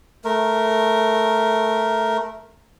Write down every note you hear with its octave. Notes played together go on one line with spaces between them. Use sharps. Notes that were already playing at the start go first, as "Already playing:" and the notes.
A3 A#4